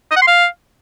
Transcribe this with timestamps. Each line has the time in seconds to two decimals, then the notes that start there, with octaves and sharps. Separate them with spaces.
0.11 D#5
0.16 F#5
0.22 C6
0.27 F5